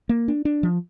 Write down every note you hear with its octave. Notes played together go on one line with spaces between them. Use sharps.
A#3
D4
D4
F3